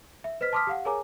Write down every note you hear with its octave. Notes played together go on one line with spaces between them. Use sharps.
E5
B4 C5 D#5 F6 B6
A5 C6 D6 D#6 F6 B6
G4 F5 F#5
G#4 A#4 C#5 G#5 A#5 D6